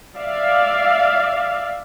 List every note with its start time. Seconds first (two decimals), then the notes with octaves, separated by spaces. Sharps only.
0.18 D5 E5 F5